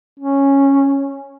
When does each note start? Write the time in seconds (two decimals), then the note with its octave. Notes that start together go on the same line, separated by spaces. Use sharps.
0.19 C#4